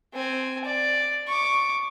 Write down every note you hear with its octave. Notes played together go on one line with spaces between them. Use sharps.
C4 G#5
D5
C#6 D6